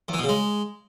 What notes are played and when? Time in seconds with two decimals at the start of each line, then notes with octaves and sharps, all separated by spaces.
0.08 E2
0.14 E3
0.19 B2
0.24 C#3
0.29 G#3